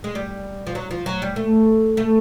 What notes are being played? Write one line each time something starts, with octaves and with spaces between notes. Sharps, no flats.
G#3
G3
F3
F#3
F3
F#3
G3
A3
A3